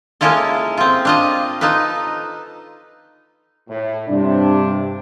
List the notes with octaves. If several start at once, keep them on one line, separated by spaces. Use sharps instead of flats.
G#3 A#3 C#4 E4 F4 A4
C4 F4
D4 F4 D#5
D#4 F4 A4 B4
A2
G2 C3 D4